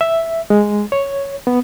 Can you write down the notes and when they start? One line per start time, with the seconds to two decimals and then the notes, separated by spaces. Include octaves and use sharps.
0.01 E5
0.50 G#3
0.92 C#5
1.47 B3